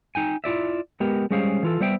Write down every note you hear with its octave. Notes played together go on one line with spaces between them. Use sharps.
D#4 G5 G#5
E4 F4 D5 E5
G#3 B3 G4 A#4
G3 G#3 C#4 G#4 C5 F5
E3 F4 A4
G3 B3 C5 E5 G5